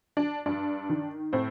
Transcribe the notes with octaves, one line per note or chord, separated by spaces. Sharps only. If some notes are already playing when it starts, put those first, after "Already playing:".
D4
G2 D4
D#3
A2 C4